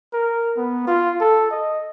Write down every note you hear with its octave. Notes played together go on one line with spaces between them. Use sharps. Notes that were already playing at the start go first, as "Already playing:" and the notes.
A#4
B3
F4
A4
D#5